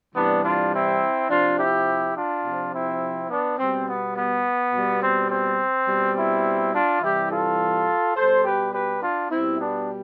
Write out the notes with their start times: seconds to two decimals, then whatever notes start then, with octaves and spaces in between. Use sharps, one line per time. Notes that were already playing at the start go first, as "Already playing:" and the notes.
0.15 C3 E3 G3 B3 D4
0.43 D4 F4
0.72 C4 E4
1.29 C3 F3 D4 F4
1.58 E4 G4
2.15 D4 F4
2.44 C3 F3
2.72 C4 E4
3.30 B3 D4
3.58 B2 G3 C4
3.86 B3
4.15 B3
4.72 B2 G3
5.01 C4
5.30 C4
5.87 B2 G3
6.15 C4 E4
6.73 D4 F4
7.01 C3 E3 G3 E4 G4
7.30 F4 A4
8.16 B2 G3 A4 C5
8.44 G4 B4
8.72 G4 B4
9.01 D4 F4
9.29 B2 G3 C4 E4
9.58 B3 D4